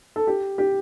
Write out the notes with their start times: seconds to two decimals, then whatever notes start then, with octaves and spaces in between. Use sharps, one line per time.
0.16 A4
0.27 G4
0.58 G4